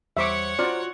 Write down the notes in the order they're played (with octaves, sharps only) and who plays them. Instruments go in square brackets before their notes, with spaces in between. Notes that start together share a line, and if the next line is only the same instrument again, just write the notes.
[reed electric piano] E2 G3 C5 [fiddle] C#5 F#5 [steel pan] E5 C#6 D6
[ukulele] F4 F#4 [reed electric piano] C5 A#5 [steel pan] D5